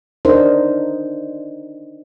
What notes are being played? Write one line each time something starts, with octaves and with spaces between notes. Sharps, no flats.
D4 D#4 A#4 C5